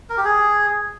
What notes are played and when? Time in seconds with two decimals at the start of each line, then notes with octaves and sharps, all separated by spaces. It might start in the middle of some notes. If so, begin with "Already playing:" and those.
0.10 A#4
0.17 G4
0.25 G#4